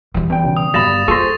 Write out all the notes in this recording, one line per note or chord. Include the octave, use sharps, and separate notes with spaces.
E3 G3
E2 G5
B1 C#3
D#6
G1 G3 F5 B5 A6 A#6 E7
F4 G#4 A4 C5 C#6 A#6